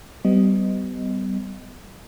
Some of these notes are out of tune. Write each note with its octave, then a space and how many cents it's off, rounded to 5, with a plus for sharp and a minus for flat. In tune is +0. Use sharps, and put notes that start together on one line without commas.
G3 -20 B3 +35 D#5 +0